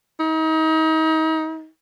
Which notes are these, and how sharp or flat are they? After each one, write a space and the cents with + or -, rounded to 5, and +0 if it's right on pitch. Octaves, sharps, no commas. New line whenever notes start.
D#4 +35